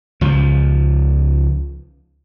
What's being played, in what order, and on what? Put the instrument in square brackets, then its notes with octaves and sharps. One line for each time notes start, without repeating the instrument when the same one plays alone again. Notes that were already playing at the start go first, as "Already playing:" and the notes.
[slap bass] C#2 F3